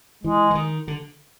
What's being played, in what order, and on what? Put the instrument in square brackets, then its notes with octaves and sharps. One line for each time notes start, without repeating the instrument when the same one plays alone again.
[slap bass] E3 [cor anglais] G#3
[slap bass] E3
D#3
D3